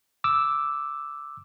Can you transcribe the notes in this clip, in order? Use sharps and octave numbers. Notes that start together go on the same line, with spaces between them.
D6 E6